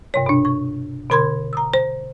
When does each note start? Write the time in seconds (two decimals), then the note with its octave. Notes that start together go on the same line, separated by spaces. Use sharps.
0.14 G2 C3 C#5
0.26 B2 D4
0.45 C#6
1.10 B2 D3 A#4 B5 C6 G#6
1.53 A#5 D#6 E6
1.74 C5